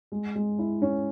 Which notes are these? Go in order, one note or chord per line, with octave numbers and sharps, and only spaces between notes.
G#3
G#3
E4
C#4